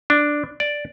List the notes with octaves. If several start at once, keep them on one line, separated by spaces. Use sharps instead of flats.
D4
D5